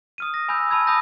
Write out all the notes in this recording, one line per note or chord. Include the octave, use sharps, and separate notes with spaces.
D#6 F6 D#7
A#6
G#5 B5 E6 G6
A5 B5 E6 G#6
A5 B5 D#6 E6 G6 A#6